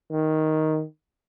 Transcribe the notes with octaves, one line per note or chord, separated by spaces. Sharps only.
D#3